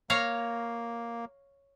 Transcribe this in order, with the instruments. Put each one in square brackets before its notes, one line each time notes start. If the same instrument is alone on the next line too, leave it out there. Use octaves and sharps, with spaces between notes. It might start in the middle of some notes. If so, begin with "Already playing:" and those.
[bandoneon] A#3 [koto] C#5 F5 A#5